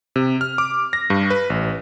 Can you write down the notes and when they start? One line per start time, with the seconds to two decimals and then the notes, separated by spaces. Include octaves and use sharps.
0.16 C3
0.41 F6
0.58 D6
0.93 A#6
1.10 G2
1.30 B4
1.50 A1